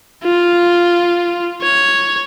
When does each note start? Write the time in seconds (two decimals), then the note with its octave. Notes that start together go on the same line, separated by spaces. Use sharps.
0.23 F4
1.62 C#5